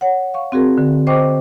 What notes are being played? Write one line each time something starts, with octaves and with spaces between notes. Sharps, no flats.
C#5 F#5
F5 C#6
C4 F#4 G#4 A#4
D3
C5 D#5 G5 C#6 D6